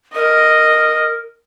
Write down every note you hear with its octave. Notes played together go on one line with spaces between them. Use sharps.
A#4 D#5